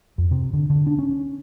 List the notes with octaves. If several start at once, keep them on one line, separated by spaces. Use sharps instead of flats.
F2
C3
D3
D3
D4
C#4